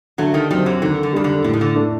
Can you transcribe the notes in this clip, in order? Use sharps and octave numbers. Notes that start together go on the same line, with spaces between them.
D3 F#3 A3
D#3 G3
D#3 F#3 G3 C4
D3 F#3
D3 D#3
D3
D#3 G3 D4
D3
A2 D3
D#3
D3
A3 D4